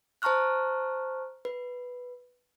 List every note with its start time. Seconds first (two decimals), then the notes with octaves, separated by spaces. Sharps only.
0.22 C5 A5 A#5 C#6 F6 F#6
1.45 B4